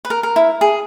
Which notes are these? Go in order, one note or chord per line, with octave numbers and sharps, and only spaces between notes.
B4
A#4
A#4
E4
G#4